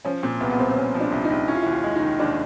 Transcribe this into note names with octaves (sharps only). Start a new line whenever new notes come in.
F3 C#4
A#2 C4
C2 B3
B3
C2 C4
C4
C2 C#4
F3
D4
C2
D#4
C2
C#4 E4
F4
E4
D#2
F4
G#3
D#4
D#3
D#2 D4